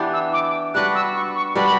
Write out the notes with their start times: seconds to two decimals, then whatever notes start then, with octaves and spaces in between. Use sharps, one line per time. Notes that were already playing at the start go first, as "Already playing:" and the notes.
Already playing: E3 B3 D4 G4
0.13 E6
0.33 D6
0.74 G3 D4 F#4 B4 F#6
0.95 E6
1.15 C#6
1.36 C#6
1.55 G3 D4 F#4 B4 B5